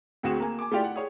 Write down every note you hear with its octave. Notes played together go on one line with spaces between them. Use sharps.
D2 C4 F#4 G#4 E7
A#3 G#5
G#5 D6
A3 E4 F4 G4 D5
F#5
G#4 C#5